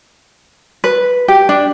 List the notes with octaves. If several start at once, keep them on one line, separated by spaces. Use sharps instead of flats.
B4
G4
D4